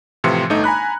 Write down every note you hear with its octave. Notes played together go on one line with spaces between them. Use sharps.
A2 C3 E3 F3 C6 C#7
G1 A3 D#4
G#5 A#5 B5 F#6